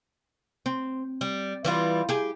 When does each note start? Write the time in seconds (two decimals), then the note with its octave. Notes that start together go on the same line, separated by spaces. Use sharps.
0.66 C4
1.21 G3
1.65 E3 G3 F4
2.09 G4 G#4